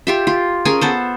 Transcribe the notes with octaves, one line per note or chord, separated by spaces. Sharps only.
F4 G4 E5
F4
C#4 G#4 A#4 G#5
B3 A4 C5